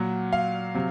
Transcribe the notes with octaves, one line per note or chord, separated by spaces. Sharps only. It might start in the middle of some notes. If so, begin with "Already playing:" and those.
Already playing: A#2 F#3 F#5
F5
C3 F#3